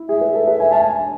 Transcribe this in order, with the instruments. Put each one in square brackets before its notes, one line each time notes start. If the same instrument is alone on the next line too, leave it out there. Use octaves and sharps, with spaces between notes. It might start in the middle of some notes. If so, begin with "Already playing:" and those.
Already playing: [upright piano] E4
[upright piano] G#4 [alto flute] E5
[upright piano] B4
A4
B4
G#5
A5
G#5